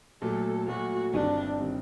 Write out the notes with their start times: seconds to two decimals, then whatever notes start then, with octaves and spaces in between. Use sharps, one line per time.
0.22 A#2 F#3 A3 A4
0.67 A#2 F#3 A3 F#4
1.13 G1 G2 D#3 G3 C4 D4
1.60 D#3 G3 C4